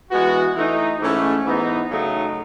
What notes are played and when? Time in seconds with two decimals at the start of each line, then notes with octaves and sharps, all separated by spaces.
0.11 E3 G#3 B3 F#4
0.55 E3 A3 D#4
1.00 G#2 E3 A3 C#4
1.45 G#2 E3 B3 D#4
1.89 C#3 F#3 A3 D#4